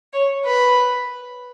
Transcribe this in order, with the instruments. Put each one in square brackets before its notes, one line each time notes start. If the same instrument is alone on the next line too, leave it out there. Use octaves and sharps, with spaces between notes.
[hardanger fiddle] C#5
B4